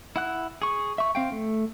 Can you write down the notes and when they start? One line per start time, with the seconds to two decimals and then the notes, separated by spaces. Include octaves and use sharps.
0.16 E4 F#5 F#6
0.62 G#4 C#6
0.98 E5 C#6
1.15 C4 F5 G5
1.32 A3